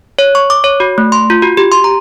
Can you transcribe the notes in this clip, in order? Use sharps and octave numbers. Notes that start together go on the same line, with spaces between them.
C#5
C#6
D6
C#5
F#4
A3
C6
F4
F#4
G4
C6
A#5